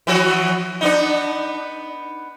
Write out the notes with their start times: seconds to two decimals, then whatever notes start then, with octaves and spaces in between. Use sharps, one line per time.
0.07 E3 F3 F#4
0.81 B3 D4 D#4